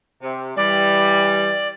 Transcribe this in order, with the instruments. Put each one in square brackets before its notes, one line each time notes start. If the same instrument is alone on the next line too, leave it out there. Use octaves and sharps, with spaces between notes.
[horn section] C3
[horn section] E3 G3 [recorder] D5